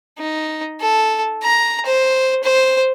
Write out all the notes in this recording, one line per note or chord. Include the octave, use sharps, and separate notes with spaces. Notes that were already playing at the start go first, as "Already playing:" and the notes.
D#4
A4
A#5
C5
C5